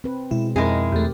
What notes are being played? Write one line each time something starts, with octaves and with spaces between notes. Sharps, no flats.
C4 B4
B2 G#3 E4
F2 G#3 C4 D#4 E4 G#4 A#4
E2 A3 G4